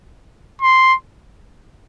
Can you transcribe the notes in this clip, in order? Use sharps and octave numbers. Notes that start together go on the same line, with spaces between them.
C6